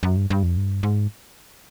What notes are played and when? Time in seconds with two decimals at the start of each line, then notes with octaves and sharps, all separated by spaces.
0.03 F#2
0.17 G2
0.30 G2
0.43 F2
0.57 G2
0.83 G#2